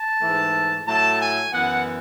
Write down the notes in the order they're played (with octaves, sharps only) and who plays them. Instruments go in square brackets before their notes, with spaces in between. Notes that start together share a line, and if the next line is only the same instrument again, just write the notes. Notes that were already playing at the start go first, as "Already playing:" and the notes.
Already playing: [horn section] A5
G#2 E3 A3
A2 F#3 A3 A5
G#5
F#2 E3 B3 F#5